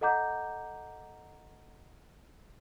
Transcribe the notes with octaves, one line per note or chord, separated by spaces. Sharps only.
A4 D#5 F#5 A#5 D6 G6